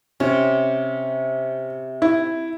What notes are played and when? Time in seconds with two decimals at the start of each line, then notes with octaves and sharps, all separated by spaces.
0.20 C3 C#4
2.02 E4